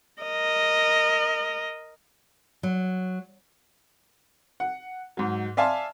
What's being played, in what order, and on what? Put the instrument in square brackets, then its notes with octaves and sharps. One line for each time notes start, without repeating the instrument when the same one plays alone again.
[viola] A#4 D#5
[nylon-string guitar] F#3
[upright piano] F#5
G#2 F#3
D5 E5 F5 G#5 A5 C6